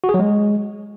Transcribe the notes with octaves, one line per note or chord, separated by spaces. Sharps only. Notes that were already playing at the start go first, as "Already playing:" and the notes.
F#4
G#4
F#3
G#3